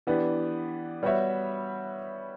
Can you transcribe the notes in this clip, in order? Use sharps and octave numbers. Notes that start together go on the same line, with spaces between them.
E3 B3 D4 G4
G3 B3 F#4 C#5 E5